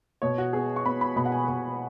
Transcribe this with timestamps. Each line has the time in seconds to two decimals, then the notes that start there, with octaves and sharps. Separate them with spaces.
0.22 B2 C#5
0.38 F#4
0.53 B3 G#4
0.76 C#6
0.85 B3 B5
1.01 B5
1.16 B2 B5
1.25 F#5
1.32 G#5
1.48 B2